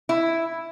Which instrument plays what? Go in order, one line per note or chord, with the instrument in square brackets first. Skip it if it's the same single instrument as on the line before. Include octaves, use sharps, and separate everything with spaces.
[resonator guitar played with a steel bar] E4